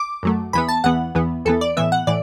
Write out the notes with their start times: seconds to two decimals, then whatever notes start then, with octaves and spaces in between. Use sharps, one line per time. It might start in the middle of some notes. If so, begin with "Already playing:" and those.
Already playing: D6
0.23 F#2 F#3 A3
0.53 E2 E3 B3 B5
0.69 A5
0.84 E2 E3 B3 F#5
1.15 E2 E3 B3
1.45 E2 E3 B3 A4
1.61 D5
1.77 A2 E3 B3 E5
1.92 F#5
2.07 A2 E3 D5